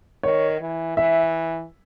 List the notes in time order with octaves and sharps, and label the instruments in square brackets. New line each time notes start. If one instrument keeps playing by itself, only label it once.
[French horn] D#3 [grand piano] C#5
[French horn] E3
[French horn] E3 [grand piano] E5